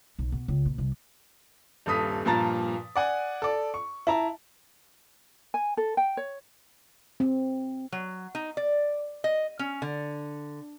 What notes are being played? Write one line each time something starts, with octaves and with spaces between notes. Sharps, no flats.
B1
B2
C#2
A#2
C2
D#1 G2 A4 D#6 B6
G2 A#2 F3 A5 A#5 A6
D5 F#5 G#5
A4 D5
C#6
E4 A5 A#5
G#5
A4
G5
C#5
C4
F#3
D#4
D5
D#5
C#4
D3